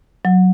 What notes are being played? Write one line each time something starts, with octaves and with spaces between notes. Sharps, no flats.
F#3